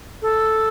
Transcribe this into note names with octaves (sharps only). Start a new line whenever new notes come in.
A4